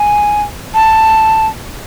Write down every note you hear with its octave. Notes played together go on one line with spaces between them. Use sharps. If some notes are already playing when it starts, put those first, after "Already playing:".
Already playing: G#5
A5